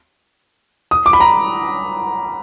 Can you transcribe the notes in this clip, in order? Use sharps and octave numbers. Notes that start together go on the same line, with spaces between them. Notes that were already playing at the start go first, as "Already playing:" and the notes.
D#6
D6
B5
A#5